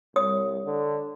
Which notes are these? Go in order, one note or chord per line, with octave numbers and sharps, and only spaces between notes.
C2 C#5 D#6
D3